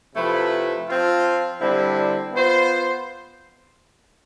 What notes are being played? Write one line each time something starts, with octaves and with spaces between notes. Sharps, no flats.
C3 F3 A3 E4 B4
F3 C4 F4
D3 G3 C4 E4
B3 F4 C5